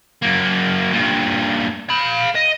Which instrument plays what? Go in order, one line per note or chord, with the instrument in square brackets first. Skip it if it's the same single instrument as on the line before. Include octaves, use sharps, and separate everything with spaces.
[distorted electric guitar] F#2 A#3
G2 A#2
F5 B5
D#5